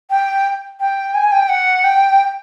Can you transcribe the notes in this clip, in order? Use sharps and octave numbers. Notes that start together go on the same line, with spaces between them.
G5
G5
G#5
G5
F#5
G5